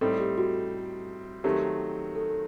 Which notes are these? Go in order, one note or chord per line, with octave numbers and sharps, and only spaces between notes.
A2 G3 C4 D#4 A4
G4
F#4
D#3 F#3 A3 C4 G4
A4